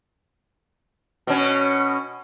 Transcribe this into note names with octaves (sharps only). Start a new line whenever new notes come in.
B2 C#4